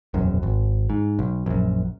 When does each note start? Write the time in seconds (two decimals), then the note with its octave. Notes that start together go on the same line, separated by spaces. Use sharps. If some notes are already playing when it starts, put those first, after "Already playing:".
0.14 E1 A#1 F#2
0.43 G#1
0.90 G#2
1.19 B1
1.46 A#1 F#2